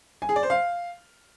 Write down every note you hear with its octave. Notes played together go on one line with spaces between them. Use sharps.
G#5
G#4
D5
C5
F5